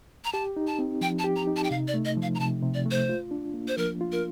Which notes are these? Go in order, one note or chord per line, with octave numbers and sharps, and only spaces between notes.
A#5
G4 A5
D#4
A5
C4
F3 G5
A5
G4
A#5
D#4
A5
G5
C3 F5
D5
A3
D#5
F3
F5
A#5
C3 A5
C3
D5
A3 C5
F4
D4
A#3
C5
F3 A#4
F4
A#4